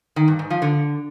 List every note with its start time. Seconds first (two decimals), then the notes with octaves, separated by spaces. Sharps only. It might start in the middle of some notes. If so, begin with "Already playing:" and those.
0.16 D#3
0.28 G2
0.39 G#2
0.50 F3
0.62 D3